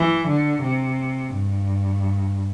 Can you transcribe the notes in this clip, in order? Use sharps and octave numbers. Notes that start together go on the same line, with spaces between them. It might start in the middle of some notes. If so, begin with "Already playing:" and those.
Already playing: E3
D3
C3
G2